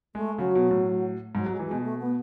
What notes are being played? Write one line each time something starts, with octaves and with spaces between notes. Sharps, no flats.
G#3 A3
C#3 F#3
B2
A2
G#2 F#3
F#3
G#3
E3
B2 G#3
A3
B3